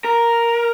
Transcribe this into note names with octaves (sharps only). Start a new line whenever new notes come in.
A#4